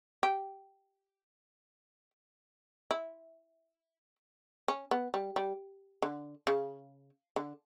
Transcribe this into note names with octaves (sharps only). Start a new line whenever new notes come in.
G4
E4
C#4
B3
G3
G3
D3
C#3
D3